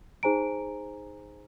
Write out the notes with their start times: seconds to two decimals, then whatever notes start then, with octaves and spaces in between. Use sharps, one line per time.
0.23 D#4 G#4 C5 G#5 A#5 D7